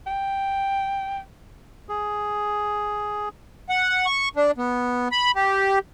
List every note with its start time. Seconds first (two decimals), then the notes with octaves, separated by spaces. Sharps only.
0.07 G5
1.89 G#4
3.69 F#5
4.06 C#6
4.36 D4
4.58 B3
5.11 B5
5.35 G4